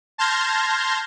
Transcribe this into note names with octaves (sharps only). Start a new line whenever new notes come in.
A5 C6 F6 G6 G#6 A#6